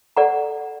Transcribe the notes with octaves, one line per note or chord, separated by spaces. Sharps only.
A4 D5 F#5 A#5